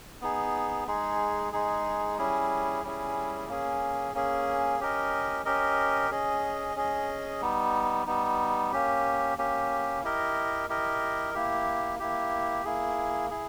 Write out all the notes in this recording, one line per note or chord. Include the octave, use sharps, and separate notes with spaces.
B3 D#4 G#4
G#3 D#4 G#4
G#3 D#4 G#4
G3 C#4 E4 G#4
G3 C#4 E4 G#4
A#3 C#4 G#4
A#3 C#4 G#4
C#4 G4 A#4 D#5
C#4 G4 A#4 D#5
C#4 G#4 D#5
C#4 G#4 D#5
G3 B3 D#4
G3 B3 D#4
A#3 C#4 G4
A#3 C#4 G4
E4 G4 A#4 D#5
E4 G4 A#4 D#5
A#3 E4 G4
A#3 E4 G4
A#3 E4 G#4
E4 G#4